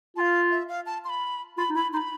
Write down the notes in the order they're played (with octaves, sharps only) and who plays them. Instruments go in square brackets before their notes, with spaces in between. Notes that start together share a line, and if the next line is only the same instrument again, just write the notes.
[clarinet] F4 [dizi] F5 A5
[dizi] E5
F5
A5
C6
B5
[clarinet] F4 [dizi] B5
[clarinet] D#4
[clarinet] E4 [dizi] B5
[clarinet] D#4 [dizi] C6
[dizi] B5